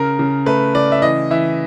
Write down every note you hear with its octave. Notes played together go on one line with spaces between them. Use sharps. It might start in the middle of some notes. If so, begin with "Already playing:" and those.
Already playing: C#3 A#4
C#3
A3 B4
C#3 D5
E5
E3 D#5
E3 E5